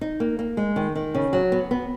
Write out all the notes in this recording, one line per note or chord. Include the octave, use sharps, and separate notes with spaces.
D#4
A#3
A#3
G#3
D#3
D#3
C#3
F#3
B3
B3